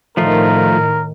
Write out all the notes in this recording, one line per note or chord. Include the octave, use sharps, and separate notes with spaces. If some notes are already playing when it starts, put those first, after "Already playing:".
A2 D#3 F3 A3 F4 A#4